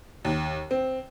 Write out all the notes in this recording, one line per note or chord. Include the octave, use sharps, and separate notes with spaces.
D#2
C4